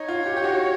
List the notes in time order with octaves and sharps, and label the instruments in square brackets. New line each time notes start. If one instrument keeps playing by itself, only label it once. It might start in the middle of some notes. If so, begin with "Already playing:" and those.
Already playing: [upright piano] D#4 [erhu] C#5
[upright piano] F4
G4
G4
F#4